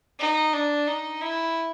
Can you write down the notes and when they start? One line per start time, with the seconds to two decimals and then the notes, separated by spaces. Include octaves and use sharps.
0.19 D#4
0.53 D4
0.87 D#4
1.21 E4